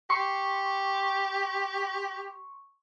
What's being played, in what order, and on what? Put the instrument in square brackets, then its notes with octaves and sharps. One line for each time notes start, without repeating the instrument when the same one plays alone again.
[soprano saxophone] G4 [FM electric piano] C6 C#6